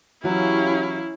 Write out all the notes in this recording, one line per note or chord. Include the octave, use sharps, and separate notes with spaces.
E3 F#3 C#4 E4 G4 F5